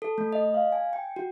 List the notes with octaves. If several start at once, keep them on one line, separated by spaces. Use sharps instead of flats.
A4
A3
D#5
F5
G#5
G5
F#4